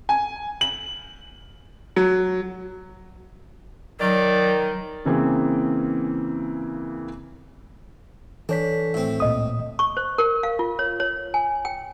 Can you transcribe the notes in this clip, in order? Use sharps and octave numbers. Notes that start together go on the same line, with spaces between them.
G#5
F#7
F#3
D#3 F#3 D5
C#3 E3 A#3 C4 G#4
E3 D4 A4 C#5 B6
A2 C4
C#2 A#2 D#5 D#6
C#6
C5
A#4
F5
F4
C#5
C#5
G#5
G5